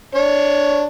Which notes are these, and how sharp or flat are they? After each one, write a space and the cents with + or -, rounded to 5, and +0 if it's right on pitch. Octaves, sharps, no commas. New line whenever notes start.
D4 +0 C#5 +5